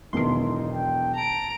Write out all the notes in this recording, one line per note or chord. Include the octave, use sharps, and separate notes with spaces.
E1 B1 D#3 E3 D#4 C6
G5
A5 A#5 D7